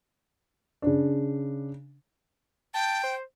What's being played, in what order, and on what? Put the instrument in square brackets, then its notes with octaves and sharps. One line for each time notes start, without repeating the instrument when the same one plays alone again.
[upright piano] C#3 D4
[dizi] G5 [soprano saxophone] A5
[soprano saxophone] C5